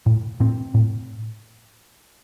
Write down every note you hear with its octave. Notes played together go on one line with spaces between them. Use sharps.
A2
A2 C4
A2